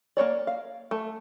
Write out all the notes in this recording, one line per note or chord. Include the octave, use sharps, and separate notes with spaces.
A#3 D#4 C#5 D5
F5
A3